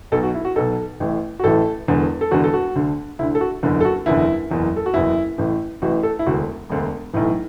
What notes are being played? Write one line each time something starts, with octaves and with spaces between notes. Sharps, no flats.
B1 B2 A4
F#4
E4
F#4
B1 B2 A4
A1 A2 E3
F#4
A1 A2 E3 A4
E1 E2 D3
A4
E1 E2 D3 F#4
A4
F#4
D2 D3
D2 D3 E4
A4
F#4
F#1 E2 D3 E4
A4
F#4
F#1 E2 D3 E4
F#1 E2 E3
A4
F#4
F#1 E2 E3 E4
A1 A2 E3
A1 A2 E3 F#4
A4
E4
E1 D2 D3 F#4
E1 D2 D3
B1 A2 E3